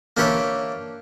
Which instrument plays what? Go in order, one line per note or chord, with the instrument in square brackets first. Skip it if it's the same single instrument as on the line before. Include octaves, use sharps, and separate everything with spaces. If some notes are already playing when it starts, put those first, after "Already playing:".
[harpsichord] A#3 D4 G4 B4 C#5 E5